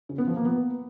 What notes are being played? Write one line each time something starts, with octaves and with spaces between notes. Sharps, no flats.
C#3
B3
F3
A#3
B3